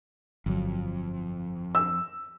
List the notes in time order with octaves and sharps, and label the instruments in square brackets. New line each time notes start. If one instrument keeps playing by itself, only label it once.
[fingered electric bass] G1 F#3 [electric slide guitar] F2
[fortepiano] E6